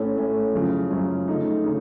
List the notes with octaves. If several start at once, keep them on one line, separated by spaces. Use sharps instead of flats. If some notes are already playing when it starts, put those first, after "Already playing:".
Already playing: A2 A3 C#4
A2 A3 C#4
F#2 C#3 F3
F#2 C#3 F3
C#3 A3 D#4
C#3 D#4